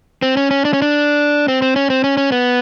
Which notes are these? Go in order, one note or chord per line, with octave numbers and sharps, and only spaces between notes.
C4
C#4
C#4
D4
C#4
D4
C4
C4
C#4
C4
C#4
C#4
B3